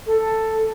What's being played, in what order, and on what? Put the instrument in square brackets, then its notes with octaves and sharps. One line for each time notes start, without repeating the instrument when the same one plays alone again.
[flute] A4